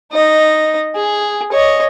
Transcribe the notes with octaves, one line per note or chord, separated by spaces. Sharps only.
D#4 D#5
G#4
C#5 D#5